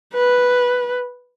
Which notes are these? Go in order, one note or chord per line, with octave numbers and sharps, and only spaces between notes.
B4